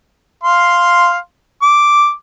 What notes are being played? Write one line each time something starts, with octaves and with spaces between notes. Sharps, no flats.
F5 C6
D6